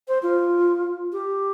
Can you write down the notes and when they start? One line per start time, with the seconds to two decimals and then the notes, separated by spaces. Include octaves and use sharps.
0.08 C5
0.23 F4
1.12 G4